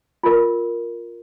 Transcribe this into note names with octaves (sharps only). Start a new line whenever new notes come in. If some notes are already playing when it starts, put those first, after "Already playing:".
F4 A#4